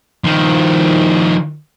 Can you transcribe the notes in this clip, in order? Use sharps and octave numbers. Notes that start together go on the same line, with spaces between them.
D#3 F3